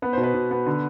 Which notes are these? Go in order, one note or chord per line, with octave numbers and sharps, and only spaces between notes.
B3 B4
B2 C5
B4
B2
B3
D3